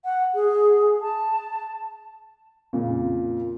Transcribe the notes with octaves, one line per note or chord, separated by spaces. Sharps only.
F#5
G#4
A5
F2 A#2 C#3